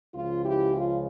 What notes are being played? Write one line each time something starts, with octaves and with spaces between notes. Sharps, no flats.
C#2 C#3 F3 F4
E4 G4
F4